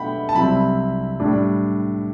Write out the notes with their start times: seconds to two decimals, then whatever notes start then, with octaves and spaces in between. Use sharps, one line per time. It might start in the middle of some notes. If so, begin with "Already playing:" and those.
Already playing: B2 A3 D4 E5 F#5 G5 B5
0.29 A5
0.35 C2 C3 F#3 C4 E4 B5
1.20 A2 G3 D4